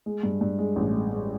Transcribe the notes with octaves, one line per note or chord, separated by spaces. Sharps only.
G#3
G2
G2
G#3
A1
G#3
G#3